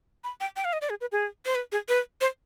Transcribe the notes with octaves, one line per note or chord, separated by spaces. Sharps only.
B5
G5
G5
F5
D#5
D5
G#4
B4
G#4
C5
B4
G#4
B4
C5